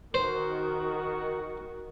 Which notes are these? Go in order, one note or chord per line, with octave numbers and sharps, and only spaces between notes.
D#3 F#4 C5